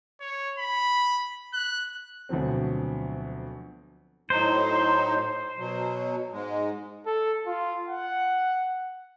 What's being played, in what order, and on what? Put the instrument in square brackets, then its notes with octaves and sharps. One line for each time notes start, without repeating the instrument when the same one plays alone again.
[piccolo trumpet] C#5
B5
F#6
[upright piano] D2 B2 F3 F#3 C4
[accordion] A2 F#3 D#4 [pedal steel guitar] C5
[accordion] B2 F#3
G#2 G#3
[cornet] A4
F4
F#5